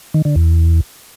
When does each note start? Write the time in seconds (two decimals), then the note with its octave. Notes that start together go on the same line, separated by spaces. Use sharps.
0.14 D#3
0.25 D3
0.36 E2